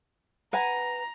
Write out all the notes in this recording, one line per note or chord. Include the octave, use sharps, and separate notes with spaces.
B4 F#5 G#5 A#5